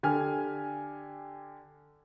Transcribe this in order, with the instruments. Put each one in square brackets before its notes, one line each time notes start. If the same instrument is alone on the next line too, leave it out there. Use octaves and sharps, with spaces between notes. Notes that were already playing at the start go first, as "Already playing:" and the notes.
[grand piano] D3 G4 G#5 F6